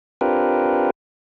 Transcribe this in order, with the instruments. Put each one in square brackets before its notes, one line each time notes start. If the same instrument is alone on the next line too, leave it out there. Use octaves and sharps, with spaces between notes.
[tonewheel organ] C4 D4 F4 G4 A#4 B4